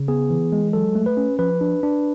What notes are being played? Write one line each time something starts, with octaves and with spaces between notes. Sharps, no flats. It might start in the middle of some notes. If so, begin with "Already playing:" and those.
Already playing: C#3
B3 G#4
E3
G#3
F#3 A4
A3
B4
C#4
F3 B4
D4
D4